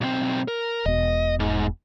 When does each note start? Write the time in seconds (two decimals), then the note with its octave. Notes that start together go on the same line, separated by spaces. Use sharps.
0.01 B1 C4
0.48 A#4
0.86 E1 B2 D#5
1.40 G#2